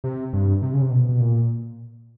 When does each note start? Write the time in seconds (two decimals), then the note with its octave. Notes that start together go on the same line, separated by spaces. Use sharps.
0.04 C3
0.33 G2
0.62 C3
0.73 C#3
0.82 C3
0.90 B2
1.09 B2
1.20 A#2